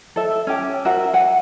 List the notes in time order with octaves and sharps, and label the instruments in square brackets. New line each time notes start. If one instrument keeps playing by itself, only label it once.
[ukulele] A4 E5
C#4 G4
F#4 A#4 E5
F#5 G#5